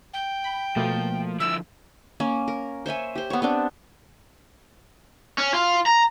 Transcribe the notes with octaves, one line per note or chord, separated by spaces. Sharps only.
G5
B5
B2 F3 A3 A#3
D3 F3 E4 E6
A#3 C#4 G#5
A#4
C5 C#5 E5 G#5
G4 C5
B3 C#5
B3 C4 D4
C#4
F4
A#5